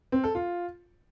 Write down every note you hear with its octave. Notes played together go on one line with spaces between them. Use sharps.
C4
A4
F4